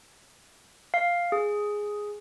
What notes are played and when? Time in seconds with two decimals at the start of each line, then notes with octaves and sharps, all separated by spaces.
0.94 F5
1.32 G#4